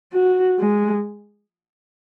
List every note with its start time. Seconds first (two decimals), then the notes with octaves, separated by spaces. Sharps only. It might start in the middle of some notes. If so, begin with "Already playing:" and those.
0.13 F#4
0.59 G#3